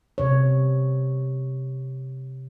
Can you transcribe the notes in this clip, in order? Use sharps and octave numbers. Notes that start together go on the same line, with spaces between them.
C3 C#5